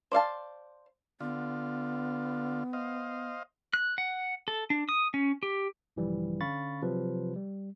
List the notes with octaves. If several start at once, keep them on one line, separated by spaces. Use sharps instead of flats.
C5 D5 F5 A5
D3 B3 F4
C5 D#5 F5
F#6
F#5
A4
D4
D#6
C#4
G4
A#1 G2 C#3 E3 F3 G3
D3 C#4 F5 B5 C#6 A6
C3 F3 F#3 B4
G3